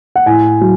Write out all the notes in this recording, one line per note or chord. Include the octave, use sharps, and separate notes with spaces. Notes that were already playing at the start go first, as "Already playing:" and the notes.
F#5
A2 G#5
F#3